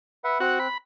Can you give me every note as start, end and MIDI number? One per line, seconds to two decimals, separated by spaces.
0.24 0.38 71
0.24 0.38 76
0.24 0.38 78
0.40 0.67 60
0.40 0.59 66
0.40 0.67 90
0.60 0.78 83